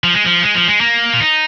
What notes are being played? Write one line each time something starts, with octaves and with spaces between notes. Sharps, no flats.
F3
G#3
F3
G#3
F3
G#3
A#3
F4
D#4